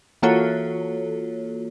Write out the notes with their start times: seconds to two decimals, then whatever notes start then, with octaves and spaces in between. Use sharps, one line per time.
0.22 E3 A#3 F4 F#4 A4 C#5